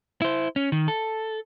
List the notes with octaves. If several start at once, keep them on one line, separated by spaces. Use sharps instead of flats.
E4 C5
C#4
D#3
A4